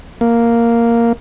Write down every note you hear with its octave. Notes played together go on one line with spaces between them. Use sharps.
A#3